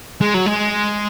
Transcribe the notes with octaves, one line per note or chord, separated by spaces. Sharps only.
G#3
F#3
G#3